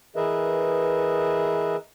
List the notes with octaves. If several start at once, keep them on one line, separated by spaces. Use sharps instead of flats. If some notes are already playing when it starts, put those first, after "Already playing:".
E3 G#4 A#4 B4 D#5 E5